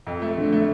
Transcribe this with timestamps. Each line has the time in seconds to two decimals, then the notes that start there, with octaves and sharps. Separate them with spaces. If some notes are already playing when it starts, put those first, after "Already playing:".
0.07 F2
0.22 A3
0.37 D3
0.53 A3